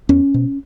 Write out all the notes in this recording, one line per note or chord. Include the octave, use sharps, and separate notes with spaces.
E2 C#4
B2